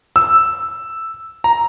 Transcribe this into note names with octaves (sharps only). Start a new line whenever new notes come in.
E6
A#5